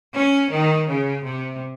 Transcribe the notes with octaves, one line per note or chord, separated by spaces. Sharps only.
C#4
D#3
C#3
C3